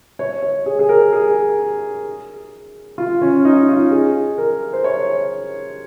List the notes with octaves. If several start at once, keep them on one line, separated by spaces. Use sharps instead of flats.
C#5
C#5
G#4
G#4
A#4
G#4
F4
C#4
D#4
F4
G#4
A#4
C5
C#5